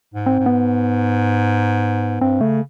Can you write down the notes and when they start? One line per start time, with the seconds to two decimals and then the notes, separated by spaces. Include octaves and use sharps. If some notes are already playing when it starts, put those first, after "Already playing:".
0.14 G#2
0.26 C4
0.40 G#2
0.46 B3
2.21 G2 C4
2.41 C#3 A3